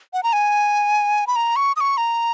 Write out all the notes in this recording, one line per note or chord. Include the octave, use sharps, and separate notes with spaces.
F#5
A#5
G#5
B5
A#5
C#6
D#6
C#6
A#5